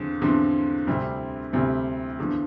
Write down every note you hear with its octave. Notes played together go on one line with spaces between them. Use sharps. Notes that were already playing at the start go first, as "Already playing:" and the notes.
Already playing: E2 D3 F3 C4
E2 D3 F3 C4
D2 C3 G3 C4
D2 C3 G3 C4
E2 D3 F3